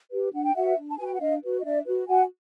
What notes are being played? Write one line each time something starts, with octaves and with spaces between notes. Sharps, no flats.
G4 B4
D4 F#5
G5
F#4 B4 E5 F#5
D4
A5
F#4 B4 G#5
G5
F#5
D4 D#5 F5
F#4 B4
D#5
D4 D5 E5
F#4 B4
F#4 F#5 G#5